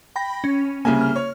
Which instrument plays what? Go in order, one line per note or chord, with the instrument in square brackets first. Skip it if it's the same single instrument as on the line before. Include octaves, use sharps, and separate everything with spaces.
[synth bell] G5 B5 A#6
C#4
[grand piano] C2 C#3 G#5 [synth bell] A#3
[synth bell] F6
[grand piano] C#5